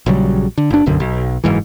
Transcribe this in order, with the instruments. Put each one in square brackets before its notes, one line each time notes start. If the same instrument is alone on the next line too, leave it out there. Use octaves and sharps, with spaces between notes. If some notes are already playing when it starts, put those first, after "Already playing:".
[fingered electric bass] A#1 C#3 F#3 G3
D3
F#1 D4
E1 B1 F#2 D3
B1
F#1 B1 G#2 E3